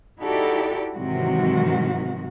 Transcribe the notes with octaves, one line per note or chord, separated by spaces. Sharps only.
D#4 E4 F#4 G4 A4 D5
G#2 C3 D#3 E3 F#3 F#4